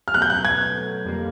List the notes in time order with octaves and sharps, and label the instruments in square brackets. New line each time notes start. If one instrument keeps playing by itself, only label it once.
[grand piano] F6
[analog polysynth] B2 F#3 A3 [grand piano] F#6
[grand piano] G6
F#6
G#6
[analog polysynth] F2 D3 G3 A#3